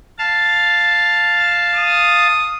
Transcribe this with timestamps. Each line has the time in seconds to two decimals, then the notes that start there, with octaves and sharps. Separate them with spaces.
0.18 F5 A5
1.76 D#6